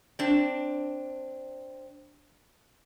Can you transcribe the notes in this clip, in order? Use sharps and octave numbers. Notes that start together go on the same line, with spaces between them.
C4 D4